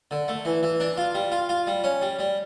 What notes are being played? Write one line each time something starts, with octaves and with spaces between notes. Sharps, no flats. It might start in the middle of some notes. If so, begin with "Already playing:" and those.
D3
A3
E3
E3
D4
F4
G3
F4
F4
G3
C#4
G3
G3